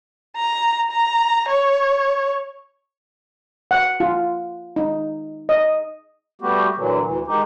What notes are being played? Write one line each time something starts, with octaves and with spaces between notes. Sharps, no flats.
A#5
A#5
C#5
F#5
F4
D#4
D#5
G3 A3 B3 F#4 G4
A#2 D3 E3 F#3
D2 E3
D#3 G#3 D#4 G4